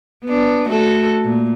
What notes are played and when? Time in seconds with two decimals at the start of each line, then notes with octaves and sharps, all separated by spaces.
0.25 B3 D4
0.69 A3 F#4 A4
1.24 A#2